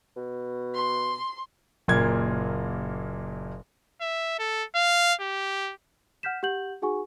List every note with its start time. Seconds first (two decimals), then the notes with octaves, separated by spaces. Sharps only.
0.16 B2
0.74 C6
1.88 F#1 A#2 A#3 G#6
4.01 E5
4.39 A4
4.75 F5
5.21 G4
6.23 F#5 F6 G6 B6 E7
6.43 G4 F#5 G6 F#7
6.82 D#4 F#4 G#4 F#5 G#5 C#6